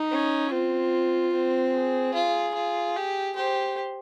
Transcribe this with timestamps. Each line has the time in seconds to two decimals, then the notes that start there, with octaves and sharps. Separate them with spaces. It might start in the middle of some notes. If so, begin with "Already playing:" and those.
Already playing: D#4
0.12 C#4
0.52 C4 F4
1.33 C4
1.73 G#4
2.14 F4
2.54 F4
2.96 G4
3.36 G4 C5